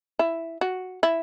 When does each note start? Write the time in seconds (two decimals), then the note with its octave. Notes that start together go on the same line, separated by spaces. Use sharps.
0.19 E4
0.61 F#4
1.03 E4